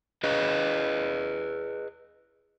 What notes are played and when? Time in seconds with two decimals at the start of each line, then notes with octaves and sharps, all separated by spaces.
0.24 G#4 B4 D#5